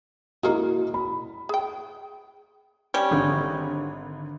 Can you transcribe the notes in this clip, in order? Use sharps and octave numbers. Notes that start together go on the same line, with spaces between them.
G#3 A#3 D#4 E4 F#4
B5
G#4 G5
G3 C#4
G#1 D3 F#5